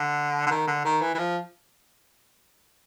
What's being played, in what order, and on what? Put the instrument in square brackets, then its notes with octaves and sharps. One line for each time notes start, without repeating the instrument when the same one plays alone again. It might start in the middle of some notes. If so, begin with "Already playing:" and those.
Already playing: [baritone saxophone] D3
D3
D#3
D3
D#3
E3
E3
F3